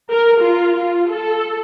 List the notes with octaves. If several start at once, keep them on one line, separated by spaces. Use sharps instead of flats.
A#4
F4
F4
A4